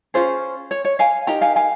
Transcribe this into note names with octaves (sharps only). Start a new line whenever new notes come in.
C#4 F4 G#4 C5
C#5
C#5
F5 G#5
D#4 G4 A#4 G5 A#5
F5 G#5
F5 G#5